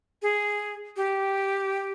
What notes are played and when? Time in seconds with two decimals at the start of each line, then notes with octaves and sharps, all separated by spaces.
0.22 G#4
0.97 G4